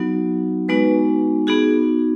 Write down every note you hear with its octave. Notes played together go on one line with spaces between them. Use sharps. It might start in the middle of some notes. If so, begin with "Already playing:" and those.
Already playing: F#3 B3 D#4 F#4
G#3 B3 D#4 F#4 B4
B3 D#4 F#4 G#4